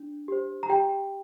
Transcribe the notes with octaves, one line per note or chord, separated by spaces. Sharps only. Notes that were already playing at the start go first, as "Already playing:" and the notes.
Already playing: D4
G4 C5
A#5
G4 G5